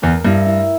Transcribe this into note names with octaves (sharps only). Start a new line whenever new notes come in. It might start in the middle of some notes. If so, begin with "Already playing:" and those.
E2 A#4
G2 E4
E4